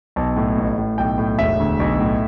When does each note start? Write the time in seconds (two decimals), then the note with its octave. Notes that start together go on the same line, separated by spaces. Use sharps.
0.16 B1 A5
0.36 A2
0.57 A1
0.78 A2
0.98 B1 G5
1.18 A2
1.39 E1 E5
1.60 D2
1.80 B1
2.00 A2